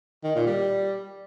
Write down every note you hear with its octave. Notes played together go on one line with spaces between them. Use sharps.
D#3
A#2
G3